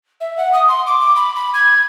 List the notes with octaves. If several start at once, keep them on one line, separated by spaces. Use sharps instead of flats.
E5
F#5
D#6
C6
D6
B5
B5
G#6